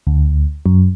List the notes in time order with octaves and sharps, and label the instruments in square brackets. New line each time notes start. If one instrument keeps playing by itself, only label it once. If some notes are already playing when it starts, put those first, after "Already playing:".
[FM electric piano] D2
F#2